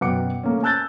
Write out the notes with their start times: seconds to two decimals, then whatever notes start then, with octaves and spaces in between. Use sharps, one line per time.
0.01 F#2 B2 F#5 G5 D6 C#7
0.43 A3 A#3 C#4
0.63 G#5 A5 E6 F#6 G6 A6